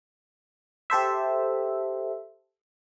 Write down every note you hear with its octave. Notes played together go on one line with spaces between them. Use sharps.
G4 A4 C5 E5